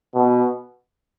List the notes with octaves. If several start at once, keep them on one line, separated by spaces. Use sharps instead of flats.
B2